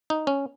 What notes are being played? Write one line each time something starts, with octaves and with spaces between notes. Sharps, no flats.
D#4
C#4